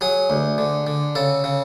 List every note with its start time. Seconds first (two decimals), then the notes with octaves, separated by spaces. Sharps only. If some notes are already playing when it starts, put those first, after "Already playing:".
0.01 F#3 G#4
0.30 D2
0.58 D3
0.87 D3
1.15 C#3 A4
1.44 C#3